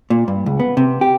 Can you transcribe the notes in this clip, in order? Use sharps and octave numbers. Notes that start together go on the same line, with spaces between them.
A#2
G2
C#2
B3
C3
G4